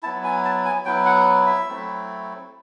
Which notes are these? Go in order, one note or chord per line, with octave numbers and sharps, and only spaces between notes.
F#3 B3 E4 A5
G#5
A5
G#5
F#3 B3 E4 G5
F#5
E5
F#3 A3 C4 E4